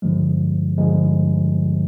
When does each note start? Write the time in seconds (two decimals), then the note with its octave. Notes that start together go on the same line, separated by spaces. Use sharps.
0.02 G2 D3 F3 G#3
0.78 G2 D3 F3 G#3